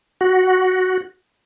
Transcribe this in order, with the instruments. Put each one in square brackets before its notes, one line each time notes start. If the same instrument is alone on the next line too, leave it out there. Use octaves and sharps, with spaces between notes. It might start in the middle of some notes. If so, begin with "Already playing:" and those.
[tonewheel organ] F#4